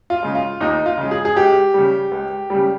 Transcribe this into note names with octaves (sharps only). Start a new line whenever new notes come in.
F4
C#3 G#3
F4
D#2 D#4
F4
C#3 G#3
G#4
G#4
C#2 G4
C#3 G3
C#2
C#3 G3